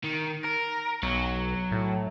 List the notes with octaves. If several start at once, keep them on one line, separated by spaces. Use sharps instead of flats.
D#3
A#4
B1 F#3
A2